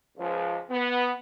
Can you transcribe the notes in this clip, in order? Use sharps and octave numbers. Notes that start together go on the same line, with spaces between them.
C#2 F3
B3